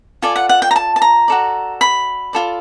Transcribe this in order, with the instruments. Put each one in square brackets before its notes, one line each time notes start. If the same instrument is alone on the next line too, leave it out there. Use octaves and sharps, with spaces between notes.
[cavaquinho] F4 A4 D5 G#5
F#5
F#5
G5
A#5
A5
A5
A#5
F#4 A4 D5
B5
F4 A4 D5